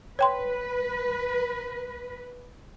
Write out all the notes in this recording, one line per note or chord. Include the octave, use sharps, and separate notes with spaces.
B4 C#5 G5 C6